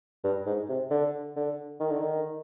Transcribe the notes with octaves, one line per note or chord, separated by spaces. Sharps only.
G2
G#2
C3
D3
D3
D#3
D3
D#3